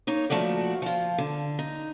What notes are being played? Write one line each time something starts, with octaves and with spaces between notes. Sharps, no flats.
A#3 D#4 C#5
A#2 F3 A3 F#4 D5
F3 F4
D3
D#4